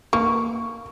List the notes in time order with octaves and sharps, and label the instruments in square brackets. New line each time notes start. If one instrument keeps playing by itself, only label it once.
[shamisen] A#3 [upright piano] C#6